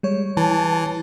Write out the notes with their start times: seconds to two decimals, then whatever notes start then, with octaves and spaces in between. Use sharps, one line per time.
0.03 G3 G#3 C#5
0.37 E3 A5